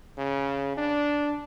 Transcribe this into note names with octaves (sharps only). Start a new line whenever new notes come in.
C#3
D4